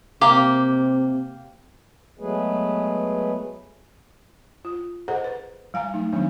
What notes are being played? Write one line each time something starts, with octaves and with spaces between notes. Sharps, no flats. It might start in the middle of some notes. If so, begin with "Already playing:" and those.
C3 A#3 G4
F#3 G#3 A3 B3 G#4 B4
F4
G#4 A4 C5 D#5 F#5 A#5
B4
G3 F5 G#5 A#5
F#3 A3 D#4
D#3 F#3 G3 B3 D4 D#4